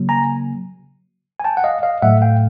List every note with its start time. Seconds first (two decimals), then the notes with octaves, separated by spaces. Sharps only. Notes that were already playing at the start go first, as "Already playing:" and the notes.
Already playing: C#3 F#3 A#3
0.09 G#5 A#5
1.40 G#5
1.44 G5 A5
1.57 F#5
1.64 D#5 F5
1.83 D#5 F5
2.02 A2 F#3 A3 E5 F#5
2.22 F5 G5